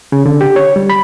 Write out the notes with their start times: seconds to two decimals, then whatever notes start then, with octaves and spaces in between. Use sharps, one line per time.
0.12 C#3
0.26 D3
0.41 G4
0.56 C#5
0.76 G3
0.90 B5